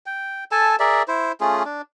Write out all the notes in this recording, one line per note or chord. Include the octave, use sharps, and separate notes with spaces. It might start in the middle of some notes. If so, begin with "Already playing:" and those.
G5
A4 G#5 A5
G#4 A#4 D5 E5
E4 C5
A3 C#4 F4 G#4
D4